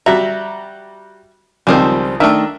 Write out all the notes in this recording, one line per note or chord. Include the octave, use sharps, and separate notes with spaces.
G3 F#4 E5 A#5
C#2 D#3 F3 G3 C4 C5
D#3 A3 D4 E5